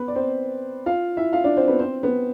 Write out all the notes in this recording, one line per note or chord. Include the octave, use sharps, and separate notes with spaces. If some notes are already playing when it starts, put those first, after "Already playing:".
Already playing: B3 B4
D5
C4 C5
F4 F5
E4 E5
F4 F5
D4 D5
C4 C5
B3 B4
C4 C5
B3 B4